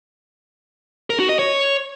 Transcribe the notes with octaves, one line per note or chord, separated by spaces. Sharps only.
A#4
F#4
D#5
C#5